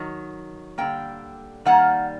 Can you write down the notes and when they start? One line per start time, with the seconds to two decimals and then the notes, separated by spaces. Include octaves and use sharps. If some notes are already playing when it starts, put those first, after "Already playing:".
Already playing: D#3 F#3
0.78 D3 G3 A#3 G5
1.66 D#3 G3 A#3 F#5